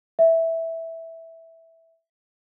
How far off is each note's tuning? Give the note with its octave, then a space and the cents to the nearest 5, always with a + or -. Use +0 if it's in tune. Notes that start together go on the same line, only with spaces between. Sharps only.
E5 -5